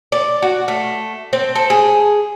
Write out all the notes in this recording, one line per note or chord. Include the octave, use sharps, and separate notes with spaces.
D5
F#4
A3
C4
A4
G#4